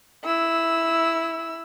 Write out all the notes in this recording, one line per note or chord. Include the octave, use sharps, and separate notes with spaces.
E4 E6